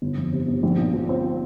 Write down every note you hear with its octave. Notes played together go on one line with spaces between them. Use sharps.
G1
F2
C3
G1
A#1
A#2
F3
C4